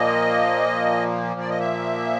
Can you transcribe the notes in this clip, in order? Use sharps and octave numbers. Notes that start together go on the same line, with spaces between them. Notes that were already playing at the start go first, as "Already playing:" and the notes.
Already playing: A#2 F3 A#3 D#5
D5
D#5
E5